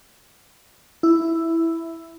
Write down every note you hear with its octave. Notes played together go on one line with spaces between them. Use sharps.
E4